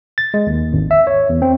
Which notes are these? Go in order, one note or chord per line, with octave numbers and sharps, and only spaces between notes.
A6
G#3
D#2
G#1
E5
C#5
E2
C4